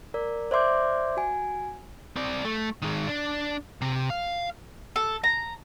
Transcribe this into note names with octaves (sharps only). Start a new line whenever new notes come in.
A#4 D5
C5 D5 E5 C6 D6 G6
F#4 G#5
C4 D5
A3
D#3 G#3
D4
C3
F5
A4
A#5